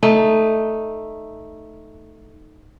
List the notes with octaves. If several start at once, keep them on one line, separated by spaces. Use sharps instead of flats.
A3 D#4